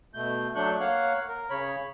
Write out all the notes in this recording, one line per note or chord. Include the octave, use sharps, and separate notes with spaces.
B2 A3 G6
F#3 A3 D4 C#6 F#6 G6
A#3 C#5 F5 F#5 F#6
A#4
C#3 C#5 B5